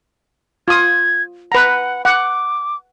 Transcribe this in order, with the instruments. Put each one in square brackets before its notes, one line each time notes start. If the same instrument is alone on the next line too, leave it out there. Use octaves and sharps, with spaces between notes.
[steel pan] F4 D#6 [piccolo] G#6
[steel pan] B4 A#5 [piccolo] F#5
[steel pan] F#5 [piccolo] D6